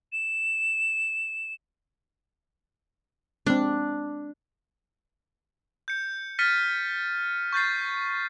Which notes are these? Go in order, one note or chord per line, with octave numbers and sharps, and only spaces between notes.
E7
G#3 C4 D4
G6 C#7
F6 A6 B6 C#7 D#7
C#6 G6 A6 C7